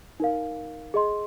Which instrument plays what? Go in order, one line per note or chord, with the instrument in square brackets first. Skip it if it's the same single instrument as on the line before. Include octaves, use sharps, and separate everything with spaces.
[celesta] D#4 A#4 F5
G#4 D#5 C6